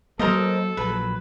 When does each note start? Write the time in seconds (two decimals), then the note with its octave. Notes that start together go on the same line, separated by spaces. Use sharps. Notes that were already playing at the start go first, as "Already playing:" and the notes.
0.19 F#3 A3 A#3 A4 A#4 C5 D#5
0.77 A#1 F#3 B4